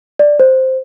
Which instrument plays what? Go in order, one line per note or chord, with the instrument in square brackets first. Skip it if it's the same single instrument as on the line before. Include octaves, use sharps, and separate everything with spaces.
[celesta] D5
C5